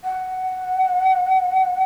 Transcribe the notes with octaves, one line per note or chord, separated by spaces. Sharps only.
F#5